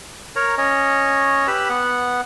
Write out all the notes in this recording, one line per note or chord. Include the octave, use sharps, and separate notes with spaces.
A#4 C#5 A#5
C#4 C#5 D#5
G4 B4 B5 E6
B3 F#5